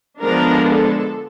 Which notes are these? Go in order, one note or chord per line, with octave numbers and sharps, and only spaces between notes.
D3 F3 G#3 B3 D4 A#4
A4